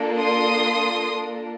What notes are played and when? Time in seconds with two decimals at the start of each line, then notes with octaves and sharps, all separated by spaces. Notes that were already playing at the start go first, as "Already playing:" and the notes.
Already playing: A#3 D4 F4 A4
0.20 C6 D#6